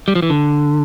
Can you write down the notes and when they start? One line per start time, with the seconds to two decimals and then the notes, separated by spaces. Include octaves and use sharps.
0.08 G3
0.15 F3
0.22 E3
0.30 D3